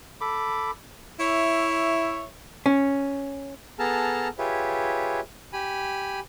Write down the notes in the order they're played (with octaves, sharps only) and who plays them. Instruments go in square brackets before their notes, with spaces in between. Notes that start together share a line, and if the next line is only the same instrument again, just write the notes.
[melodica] A4 B5 D6
[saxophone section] E4 C#5 E5
[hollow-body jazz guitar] C#4
[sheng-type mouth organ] B3 G#4 A4 A5 A#5 F6
F4 G4 G#4 B4 C#5 E5
G4 G#5 B5